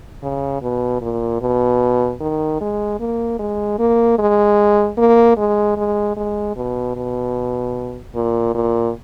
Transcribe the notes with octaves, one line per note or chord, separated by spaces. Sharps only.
C#3
B2
A#2
B2
D#3
G#3
A#3
G#3
A#3
G#3
A#3
G#3
G#3
G#3
B2
B2
A#2
A#2